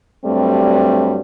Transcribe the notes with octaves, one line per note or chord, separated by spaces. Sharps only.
G2 F#3 G3 A3 C4